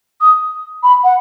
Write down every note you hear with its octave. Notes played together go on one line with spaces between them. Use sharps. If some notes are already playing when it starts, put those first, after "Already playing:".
D#6
B5
F#5